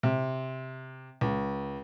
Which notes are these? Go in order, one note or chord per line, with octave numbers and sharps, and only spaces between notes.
C3
C#2